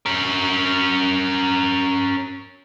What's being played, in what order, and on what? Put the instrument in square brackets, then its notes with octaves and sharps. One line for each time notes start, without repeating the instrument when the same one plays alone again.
[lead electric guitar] C#4 A#4